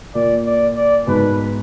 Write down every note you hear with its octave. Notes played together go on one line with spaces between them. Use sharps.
A#2 D5
D5
D5
G#2 B2 B4